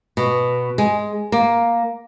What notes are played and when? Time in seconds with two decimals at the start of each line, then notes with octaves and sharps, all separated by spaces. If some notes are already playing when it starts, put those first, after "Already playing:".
0.17 B2
0.78 G#3
1.32 A#3